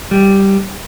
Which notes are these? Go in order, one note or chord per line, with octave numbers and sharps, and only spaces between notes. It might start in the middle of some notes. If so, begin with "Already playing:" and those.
G3